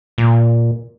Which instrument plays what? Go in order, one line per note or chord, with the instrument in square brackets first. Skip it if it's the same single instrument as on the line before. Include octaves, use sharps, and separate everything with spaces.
[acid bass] A#2